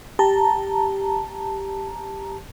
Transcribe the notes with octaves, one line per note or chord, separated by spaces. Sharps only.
G4 A5 A#5